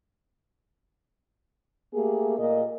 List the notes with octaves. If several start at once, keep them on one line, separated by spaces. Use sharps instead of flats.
A3 A#3 G4 G#4
A#2 D#5